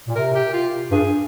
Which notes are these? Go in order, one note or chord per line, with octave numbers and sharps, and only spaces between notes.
A#2
C3 A#4
G4
F4
G2 G#4